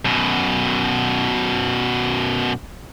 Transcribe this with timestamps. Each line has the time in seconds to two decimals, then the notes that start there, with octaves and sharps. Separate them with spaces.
0.05 F#2 B2